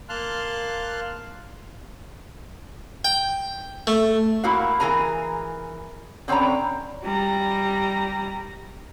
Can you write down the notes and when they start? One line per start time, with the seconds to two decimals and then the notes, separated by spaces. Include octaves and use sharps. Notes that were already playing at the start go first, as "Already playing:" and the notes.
0.09 A#3 F5 A5 C6 F6 F#6
3.05 G5
3.87 A3
4.43 A#2 A#3 E4 F#4 F5
4.80 E3 G#4 A#4 G#5 A#5
6.28 D3 C4 C#4 G5 A#5
7.04 G3 A#5